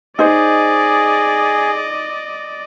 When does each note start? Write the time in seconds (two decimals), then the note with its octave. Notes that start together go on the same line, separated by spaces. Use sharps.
0.19 D#4 G#4 C5 D5 D#5